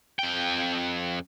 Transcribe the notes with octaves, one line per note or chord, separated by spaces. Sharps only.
F2 G5